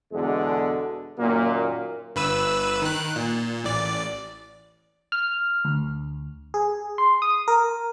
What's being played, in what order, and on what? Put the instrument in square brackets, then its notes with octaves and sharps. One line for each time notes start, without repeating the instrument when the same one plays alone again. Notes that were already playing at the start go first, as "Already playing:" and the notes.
[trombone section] E2 B2 D3 G#3
F#2 A#2 D#3 A#3
[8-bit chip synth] G1 B4 E6
D#3 F#6
A#2
A1 D5
[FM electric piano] F6
D2
G#4
C6
D#6
A#4